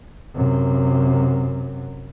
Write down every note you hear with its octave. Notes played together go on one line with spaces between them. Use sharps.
F#2 C3